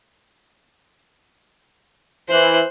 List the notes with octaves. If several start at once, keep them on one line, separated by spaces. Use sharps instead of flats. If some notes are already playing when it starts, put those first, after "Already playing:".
E3 C5 F#6